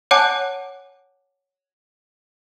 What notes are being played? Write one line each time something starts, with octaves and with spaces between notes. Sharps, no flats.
C#5 F#5 G#5 A5 D6 F#6